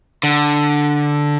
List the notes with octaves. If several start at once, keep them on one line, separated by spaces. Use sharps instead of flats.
D3